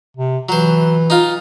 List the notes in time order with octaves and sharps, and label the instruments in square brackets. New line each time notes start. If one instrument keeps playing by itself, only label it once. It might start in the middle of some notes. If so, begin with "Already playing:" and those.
[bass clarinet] C3
[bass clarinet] E3 [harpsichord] F#3 C5
[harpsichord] D#4 F4